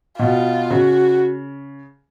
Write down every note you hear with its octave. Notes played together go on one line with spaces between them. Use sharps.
B2 F4
C#3 F#4